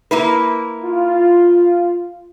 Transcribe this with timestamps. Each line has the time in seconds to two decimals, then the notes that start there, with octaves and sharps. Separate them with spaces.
0.11 A#3 E4 B4
0.83 F4